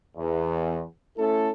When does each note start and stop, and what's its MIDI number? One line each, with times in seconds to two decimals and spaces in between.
0.17 0.84 40
1.17 1.50 57
1.17 1.50 61
1.17 1.50 64
1.17 1.50 69